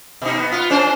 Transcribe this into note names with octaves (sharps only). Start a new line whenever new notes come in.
B2 D#4
B3
F4
C#4 D4 C5